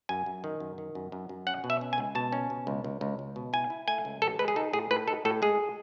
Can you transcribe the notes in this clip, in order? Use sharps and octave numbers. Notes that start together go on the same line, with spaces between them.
F#2 G#5
F#2
D#3
F#2
D#3
F#2
F#2
F#2
C#4 F#5
B2
E5
C#4
G#5
C#2
B2 A5
C#4
B2
C#2
C#2
C#2
C#2
B2
E4 G#5
E4
A3 G#5
C#2
A1 A4
G#3 B4
G#4
D#4 A4
A2 G#4
A2 B4
D#4 A4
A2 A4
G#3 G#4